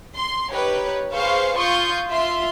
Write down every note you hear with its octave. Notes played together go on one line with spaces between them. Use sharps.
C6
D#4 G4 B4 C#5
G#4 B4 C5 F5 C#6
F4 C6 C#6 D#6 G6
F4 E5 C6